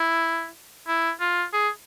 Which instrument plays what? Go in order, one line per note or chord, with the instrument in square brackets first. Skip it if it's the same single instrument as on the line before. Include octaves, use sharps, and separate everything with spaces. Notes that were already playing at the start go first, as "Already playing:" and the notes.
Already playing: [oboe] E4
E4
F4
G#4